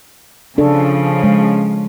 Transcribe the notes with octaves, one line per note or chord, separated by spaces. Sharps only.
C#3 F3 D4 A4
G#3